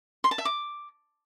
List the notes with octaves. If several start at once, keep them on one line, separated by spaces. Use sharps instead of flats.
C6
A5
E5
D6